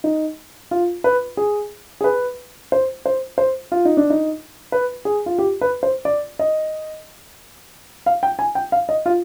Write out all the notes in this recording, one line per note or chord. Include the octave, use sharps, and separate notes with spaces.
D#4
F4
B4
G#4
G#4
B4
C5
C5
C5
F4
D#4
D4
D#4
B4
G#4
F4
G4
B4
C5
D5
D#5
F5
G5
G#5
G5
F5
D#5
F4